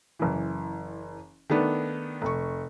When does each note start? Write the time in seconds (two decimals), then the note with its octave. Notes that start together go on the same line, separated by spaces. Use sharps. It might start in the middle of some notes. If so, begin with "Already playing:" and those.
0.19 F#1 E3
1.50 D#3 A3 B3 D4
2.22 F1 C#6